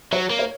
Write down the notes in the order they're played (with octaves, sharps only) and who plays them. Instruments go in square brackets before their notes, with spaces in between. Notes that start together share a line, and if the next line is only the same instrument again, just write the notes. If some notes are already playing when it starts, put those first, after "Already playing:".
[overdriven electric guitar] F#3 [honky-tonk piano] C#5
[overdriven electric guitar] A#3
[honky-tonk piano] C#5